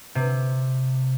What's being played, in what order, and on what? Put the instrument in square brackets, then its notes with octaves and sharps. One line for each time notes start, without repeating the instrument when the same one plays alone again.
[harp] C3